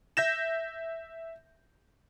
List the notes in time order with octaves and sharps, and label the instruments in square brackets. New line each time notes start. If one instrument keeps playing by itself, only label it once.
[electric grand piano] E5 G6 A#6 E7